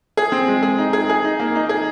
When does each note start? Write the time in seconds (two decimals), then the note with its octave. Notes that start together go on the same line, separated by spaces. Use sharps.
0.17 G#4
0.32 C4
0.48 G#3
0.63 G#4
0.78 D#4
0.93 G#4
1.10 G#4
1.24 D#4
1.39 A#3
1.55 D#4
1.69 G#4